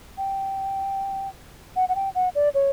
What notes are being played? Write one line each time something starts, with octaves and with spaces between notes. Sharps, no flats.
G5
F#5
F#5
G5
F#5
D5
C#5